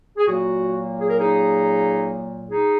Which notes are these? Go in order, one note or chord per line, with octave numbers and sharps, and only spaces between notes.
G#4
A#2 F#3 A#3 F#4
G#4
A#4
D#4 G#4
D#4 G#4